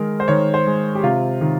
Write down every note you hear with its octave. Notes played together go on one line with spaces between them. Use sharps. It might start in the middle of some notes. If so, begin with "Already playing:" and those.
Already playing: D#3 G#3 A#4
C5
D#3 C#5
C5
G#3
G4
C3 F4
D#3